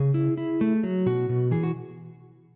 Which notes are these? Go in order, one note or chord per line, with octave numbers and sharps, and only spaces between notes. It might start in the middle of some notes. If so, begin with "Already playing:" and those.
Already playing: C#3 G#4
E4
E4
A3
F#3
B2 F#4
B2
E3 G#4
F#4